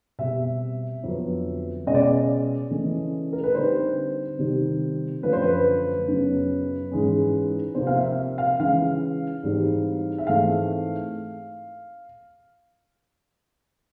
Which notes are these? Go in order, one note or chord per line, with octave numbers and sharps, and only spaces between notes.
B2 G3 C4 E5
F2 D3 F#3 B3
B2 G#3 C#4 D#5
D5
D#5
C#3 E3 A3 C#4
A#4
B4
D3 G3 C4 D#4 C5
C3 D#3 G3
F#2 D3 F3 A3 B4
C5
B4
F#2 C#3 F#3 B3
G#2 E3 G#3 C#4
C3 F3 A#3 C5
F5
E5
F5
C#3 E3 G#3 F5
G#2 E3 G3 C4 D#4
E5
G#2 E3 A3 C4 F5